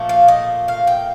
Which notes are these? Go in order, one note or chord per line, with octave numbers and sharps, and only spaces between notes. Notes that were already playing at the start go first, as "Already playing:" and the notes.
Already playing: A#2 F3 A3
F5
D#5
F5
G5